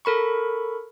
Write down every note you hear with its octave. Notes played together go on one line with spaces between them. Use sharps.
A4 A#4 B5 C#6